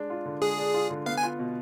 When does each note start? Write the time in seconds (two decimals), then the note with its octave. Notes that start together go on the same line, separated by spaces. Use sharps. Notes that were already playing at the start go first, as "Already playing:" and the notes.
Already playing: G#3 D4
0.10 F4
0.25 D3
0.42 G#3 G#4
0.58 D4
0.74 F4
0.90 D3
1.06 B3 F5
1.17 G#5
1.23 F4
1.39 B2